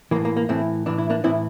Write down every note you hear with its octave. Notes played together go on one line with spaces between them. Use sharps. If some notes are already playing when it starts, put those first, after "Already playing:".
A2 E3 A#3
A#3
A#3
A2 E3 A3 C4
A2 E3 D4
E4
A#3 D4
A2 E3 C4 E4